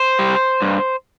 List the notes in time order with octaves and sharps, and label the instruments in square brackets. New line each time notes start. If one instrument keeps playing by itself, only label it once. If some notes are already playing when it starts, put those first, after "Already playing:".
Already playing: [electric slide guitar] C5
G3
G2